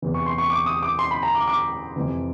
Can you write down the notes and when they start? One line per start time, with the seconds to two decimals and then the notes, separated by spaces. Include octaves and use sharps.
0.02 E2 C3 E3
0.14 C#6
0.26 C6
0.38 C#6
0.50 D6
0.66 D#6
0.83 D6
0.99 C6
1.11 B5
1.23 A#5
1.35 D6
1.48 D6
1.96 F2 C3 E3